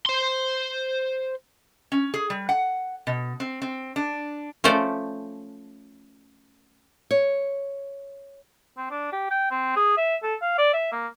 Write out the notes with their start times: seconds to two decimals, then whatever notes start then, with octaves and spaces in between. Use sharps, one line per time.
0.06 C5 C6
1.92 C#4
2.14 G#4
2.30 G3
2.49 F#5
3.07 B2
3.40 C4
3.62 C4
3.96 D4
4.64 F3 A3 C#4 C5 D5
7.11 C#5
8.77 C4
8.91 D4
9.12 G4
9.30 G5
9.51 C4
9.76 G#4
9.97 E5
10.23 A4
10.42 F5
10.58 D5
10.73 E5
10.92 A#3